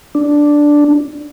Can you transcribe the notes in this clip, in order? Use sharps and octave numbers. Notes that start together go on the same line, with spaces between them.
D4